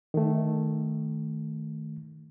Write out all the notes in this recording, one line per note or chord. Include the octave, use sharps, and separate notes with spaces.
D#3 A3